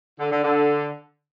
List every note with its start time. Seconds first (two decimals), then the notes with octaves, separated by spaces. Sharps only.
0.19 D3
0.31 D3
0.43 D3